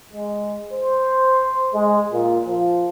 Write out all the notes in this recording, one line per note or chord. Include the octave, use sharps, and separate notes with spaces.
G#3
C5
G#3
A#2
F3